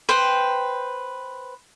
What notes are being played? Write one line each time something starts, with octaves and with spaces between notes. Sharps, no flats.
B4 C5 G5